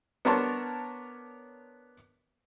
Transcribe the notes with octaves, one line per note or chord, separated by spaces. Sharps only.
B3 D4 A#4 C#5 A5 C6